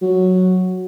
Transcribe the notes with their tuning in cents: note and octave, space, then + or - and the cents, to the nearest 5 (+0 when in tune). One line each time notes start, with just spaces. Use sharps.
F#3 -5